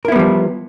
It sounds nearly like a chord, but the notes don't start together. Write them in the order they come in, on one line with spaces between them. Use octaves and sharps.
A#4 E4 B3 G3 F3